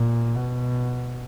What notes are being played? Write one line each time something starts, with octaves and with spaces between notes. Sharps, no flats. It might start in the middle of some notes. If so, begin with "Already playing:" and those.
Already playing: A#2
B2